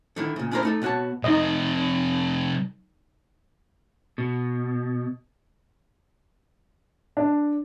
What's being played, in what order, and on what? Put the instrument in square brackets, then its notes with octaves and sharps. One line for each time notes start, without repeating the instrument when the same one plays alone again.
[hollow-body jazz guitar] D3 D#3 E4
A#2 C#3
C#4 D4 E4 F4 A#4 C5
A3 D#4 A4
B2 B3 F#4 C#5 A5
[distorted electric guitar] C3 F3 [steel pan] D#4 D#5
[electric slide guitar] B2
[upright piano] D4